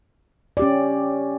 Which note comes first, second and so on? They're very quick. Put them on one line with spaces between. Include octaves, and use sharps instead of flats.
D5 G4 C#4